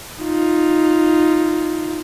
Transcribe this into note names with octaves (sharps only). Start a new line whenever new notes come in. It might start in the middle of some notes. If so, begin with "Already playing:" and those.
D#4 F4